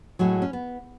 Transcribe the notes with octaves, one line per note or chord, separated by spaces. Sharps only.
A2 F#3 G#3
C#4
B3